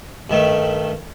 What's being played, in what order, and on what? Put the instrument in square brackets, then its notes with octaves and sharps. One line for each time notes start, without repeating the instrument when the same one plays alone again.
[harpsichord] G2 D#3 A3